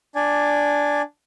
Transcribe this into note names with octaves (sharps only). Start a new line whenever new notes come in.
D4 D5 G#5